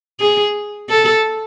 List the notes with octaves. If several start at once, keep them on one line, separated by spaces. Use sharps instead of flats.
G#4
A4